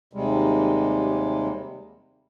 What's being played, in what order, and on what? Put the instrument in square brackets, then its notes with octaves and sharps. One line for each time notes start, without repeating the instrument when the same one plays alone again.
[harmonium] D#2 C3 G3 G#3